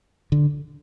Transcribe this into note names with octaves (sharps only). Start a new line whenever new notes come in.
D3